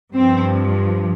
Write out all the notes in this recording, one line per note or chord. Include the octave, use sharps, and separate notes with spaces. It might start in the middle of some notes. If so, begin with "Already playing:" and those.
G2 F3 C4